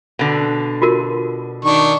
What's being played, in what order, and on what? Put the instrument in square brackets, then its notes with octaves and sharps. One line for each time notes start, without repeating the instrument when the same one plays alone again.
[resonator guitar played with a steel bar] B2 D3
[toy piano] F4 F#4 A#4
[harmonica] D#3 D4 C#6